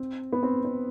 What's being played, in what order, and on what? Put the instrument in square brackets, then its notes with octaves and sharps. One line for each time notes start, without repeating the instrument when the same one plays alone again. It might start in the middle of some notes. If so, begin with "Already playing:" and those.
Already playing: [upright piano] C4
B3
C4
C4